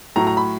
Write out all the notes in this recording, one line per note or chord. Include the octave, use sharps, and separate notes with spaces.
A2 F#3 A3 A#5
A#5
B5